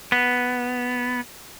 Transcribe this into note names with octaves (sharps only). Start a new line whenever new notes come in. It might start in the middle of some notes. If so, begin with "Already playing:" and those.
B3